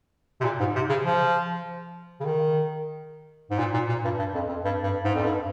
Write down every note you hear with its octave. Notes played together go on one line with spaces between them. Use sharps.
C3
A#2
G#2
C3
C#3
F3
C#3
D#3
G#2
A#2
A#2
A#2
G2
G2
F2
F2
G2
G2
G#2
F2
G2